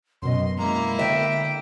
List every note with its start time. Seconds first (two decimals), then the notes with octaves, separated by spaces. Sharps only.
0.22 F#2 B2 D#5 C6
0.58 G#3 A#3 E4 A#5
0.99 D3 E5 G5